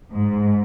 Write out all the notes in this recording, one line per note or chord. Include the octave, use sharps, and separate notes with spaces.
G#2